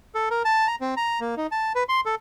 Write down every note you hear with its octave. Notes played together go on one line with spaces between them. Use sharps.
A4
A#4
A5
A#5
C4
A#5
A#3
D#4
A5
B4
C6
A4